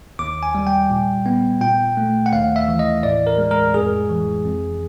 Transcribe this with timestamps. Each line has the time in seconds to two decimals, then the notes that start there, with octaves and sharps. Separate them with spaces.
0.19 D#2 D6
0.43 G#5
0.55 G3
0.67 G5
0.90 A#2
1.26 B3
1.61 A#2 G5
1.97 A3
2.26 F#5
2.33 D#2 F5
2.56 E5
2.68 E3
2.79 D#5
3.03 A2 D5
3.27 A#4
3.38 G#3
3.51 A#4
3.74 F2 G#4
4.10 E3
4.45 F2